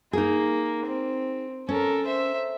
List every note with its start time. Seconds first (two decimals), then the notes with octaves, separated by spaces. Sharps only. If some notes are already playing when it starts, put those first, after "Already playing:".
0.13 A#3 D#4 G#4
0.86 C4
1.69 C#4 A4 A#4
2.06 C5 E5